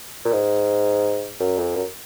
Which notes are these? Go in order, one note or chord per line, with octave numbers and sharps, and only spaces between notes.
A#2
G#2
F#2
F2
F#2